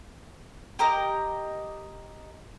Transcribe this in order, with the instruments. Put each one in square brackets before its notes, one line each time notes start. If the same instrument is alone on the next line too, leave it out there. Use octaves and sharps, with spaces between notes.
[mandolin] G4 A#4 D#5